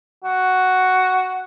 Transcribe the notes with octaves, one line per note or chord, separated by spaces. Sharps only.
F#4